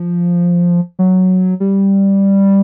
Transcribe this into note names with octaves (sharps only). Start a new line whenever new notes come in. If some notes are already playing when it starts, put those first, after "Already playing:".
Already playing: F3
F#3
G3